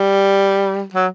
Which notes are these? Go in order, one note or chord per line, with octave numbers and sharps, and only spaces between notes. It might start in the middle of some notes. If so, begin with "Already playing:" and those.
Already playing: G3
F#3